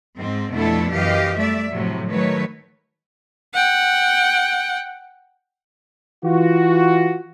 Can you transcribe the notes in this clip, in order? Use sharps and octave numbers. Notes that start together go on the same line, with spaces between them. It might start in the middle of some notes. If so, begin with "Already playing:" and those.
G#2 C4
F2 B2 A3 D4 E4 A4
F#2 E3 G4 D#5 F5
G3 A3 D5 E5
A2 C3 F3 F#3
D#3 F#3 A3 B4 C#5
F#5 G5
E3 F4 F#4